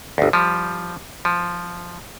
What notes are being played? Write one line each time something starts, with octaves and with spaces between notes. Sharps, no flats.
G1 D2
F3 G3
F3